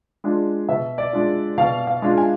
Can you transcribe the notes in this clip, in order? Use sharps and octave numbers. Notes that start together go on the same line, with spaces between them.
G#3 D4 F4
B2 E5
D5
G#3 D4 F4
B2 F5
F5
G#3 D4 F4
G#5